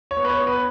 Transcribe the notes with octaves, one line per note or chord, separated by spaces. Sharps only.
C#5
B3
B4
C#5
B3
B4